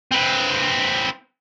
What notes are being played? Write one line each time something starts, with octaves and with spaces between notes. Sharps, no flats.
C4 B4